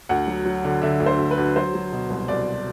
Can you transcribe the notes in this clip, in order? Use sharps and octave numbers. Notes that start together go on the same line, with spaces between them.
D2 F#5
F#3
F#3
D3
D3 E5
D2
C5
D2
B4
D2
F#3 C5
F#3
B2
C2
C2 D5